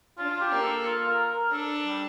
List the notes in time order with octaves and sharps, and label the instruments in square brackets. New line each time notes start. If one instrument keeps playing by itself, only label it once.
[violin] D4 [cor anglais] F4
[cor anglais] F4
G4
[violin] A#3
[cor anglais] A4
F4
A#4
A#4
[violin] D4 [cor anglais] A4
[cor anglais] G3